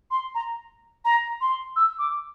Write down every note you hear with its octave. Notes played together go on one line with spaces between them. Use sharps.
C6
A#5
A#5
C6
E6
D6